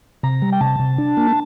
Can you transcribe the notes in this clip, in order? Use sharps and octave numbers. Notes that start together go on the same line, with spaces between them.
C3 A#5
G3
G5
C3 A5
C3
D4
A#3